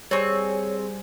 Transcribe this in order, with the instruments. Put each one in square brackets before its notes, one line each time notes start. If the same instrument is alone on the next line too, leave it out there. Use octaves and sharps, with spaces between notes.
[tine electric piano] G3 C5 G#5 [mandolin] C4 C#6 [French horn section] G#4 [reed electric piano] C#5